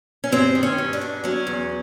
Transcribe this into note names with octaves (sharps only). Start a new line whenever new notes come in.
C#4
G2 C4
D#3
C#4
G2
D4
G2
F#3 C#4
E2